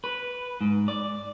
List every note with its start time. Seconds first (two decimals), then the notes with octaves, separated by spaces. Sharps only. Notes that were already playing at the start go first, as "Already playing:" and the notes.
0.04 B4
0.61 G#2
0.88 D5